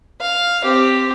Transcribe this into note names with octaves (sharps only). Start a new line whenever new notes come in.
F5
C4 G4